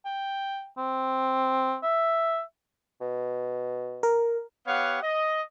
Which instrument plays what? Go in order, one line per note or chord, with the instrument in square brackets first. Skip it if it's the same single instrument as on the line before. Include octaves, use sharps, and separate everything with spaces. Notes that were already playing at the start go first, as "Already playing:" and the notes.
[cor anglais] G5
C4
E5
[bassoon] B2
[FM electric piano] A#4
[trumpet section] B3 G4 C#5 F5 F#5
D#5